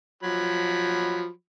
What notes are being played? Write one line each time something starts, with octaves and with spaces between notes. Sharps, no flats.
F3 F#3 B5